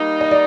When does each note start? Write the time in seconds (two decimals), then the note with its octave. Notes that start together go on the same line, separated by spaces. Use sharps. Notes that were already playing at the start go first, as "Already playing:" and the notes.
Already playing: G3 A#3 D#4
0.21 D#5
0.31 D5